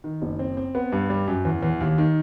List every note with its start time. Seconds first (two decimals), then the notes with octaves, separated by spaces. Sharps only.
0.04 D#3
0.22 F#1
0.39 C4
0.57 C4
0.75 B3
0.92 G2
1.10 G3
1.28 F#2
1.45 E2
1.62 E2
1.81 D#2
1.98 D#3